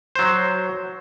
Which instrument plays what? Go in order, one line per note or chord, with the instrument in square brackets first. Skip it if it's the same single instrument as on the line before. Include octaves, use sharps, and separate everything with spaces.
[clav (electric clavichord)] F#3 C5